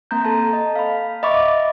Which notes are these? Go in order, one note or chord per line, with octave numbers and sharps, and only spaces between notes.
A#3 C4 A#5 G6
A4 A5
D#5
F5 B5
D#5 E5 B5 C#6 D6